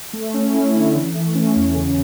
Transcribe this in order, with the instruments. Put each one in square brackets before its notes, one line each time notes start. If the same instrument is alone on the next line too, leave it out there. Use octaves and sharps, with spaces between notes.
[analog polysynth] A3
C#4
E4
D3
E3
A3
C#4
E2
C#3